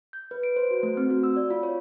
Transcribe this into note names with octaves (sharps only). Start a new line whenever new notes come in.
G6
B4
D7
C5
F#4
A3
C4
F#4
E6
D5
F4
C#5